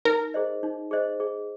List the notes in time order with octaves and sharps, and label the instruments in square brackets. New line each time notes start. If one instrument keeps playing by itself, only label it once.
[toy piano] D#4 [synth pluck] A#4
[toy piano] G#4 C5 D#5
D#4
G#4 C5 D#5
G#4